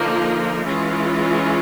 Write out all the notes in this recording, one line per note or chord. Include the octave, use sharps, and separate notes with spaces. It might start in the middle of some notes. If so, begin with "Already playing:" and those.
Already playing: D3 F3 A#3 D#4
E3 G#3 C#4 F4